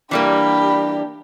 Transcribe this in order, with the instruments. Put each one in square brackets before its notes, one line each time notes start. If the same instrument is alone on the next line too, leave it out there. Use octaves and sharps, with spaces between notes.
[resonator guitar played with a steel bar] E3 G3 A#3 [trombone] D4 [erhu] G4 [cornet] B5